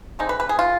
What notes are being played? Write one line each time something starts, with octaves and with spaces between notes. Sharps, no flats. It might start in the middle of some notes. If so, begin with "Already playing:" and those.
D3 G#3 C4 D#4
B4
B4
G#4
F4